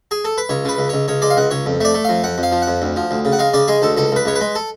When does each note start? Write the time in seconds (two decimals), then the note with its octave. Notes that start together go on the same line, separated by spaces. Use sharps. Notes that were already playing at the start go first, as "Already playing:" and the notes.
0.11 G#4
0.25 A4
0.38 B4
0.49 C#2 C#5
0.65 C#3 B4
0.78 C#2
0.89 C#2 C#5
1.08 C#2 C#5
1.22 G#3 D5
1.30 F5
1.37 C#2 F#5
1.51 C#2 C#5
1.66 F2
1.81 A3 D5
1.95 A3
2.05 F2 F5
2.24 F2 F#5
2.38 F2
2.43 F5
2.52 F3
2.62 F#5
2.67 F2
2.82 D2
2.96 F3
3.11 D2
3.25 C#3
3.32 F#5
3.39 G#3 F5
3.54 C#3 D5
3.68 G#3 G#4
3.82 D2 A4
3.97 C#2 A4
4.12 C#2 B4
4.25 C#2 C#5
4.36 B4
4.41 G#3
4.55 A4